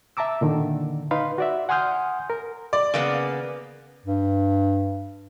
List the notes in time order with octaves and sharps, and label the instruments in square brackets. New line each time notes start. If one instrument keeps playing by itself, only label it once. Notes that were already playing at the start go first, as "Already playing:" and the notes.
[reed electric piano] E5 A5 A#5 D6 E6
A#2 D3 D#3
D#4 B4 F5 B5 C6
F#4 D5 E5
F#5 G#5 C6 D#6 F6 G6
A#4
[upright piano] D5
[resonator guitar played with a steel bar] C#3 A#3 B3
[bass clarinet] G2